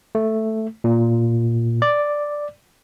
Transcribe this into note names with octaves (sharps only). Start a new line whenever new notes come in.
A3
A#2
D5